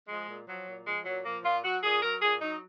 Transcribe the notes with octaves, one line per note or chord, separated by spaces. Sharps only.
F3 G#3
A#2
F3 F#3
A#2
F3 G#3
A#2 F#3
F3 A#3
A#2 F4
F#3 F#4
A#2 G#4
F#3 A#4
A#2 G#4
F#3 D#4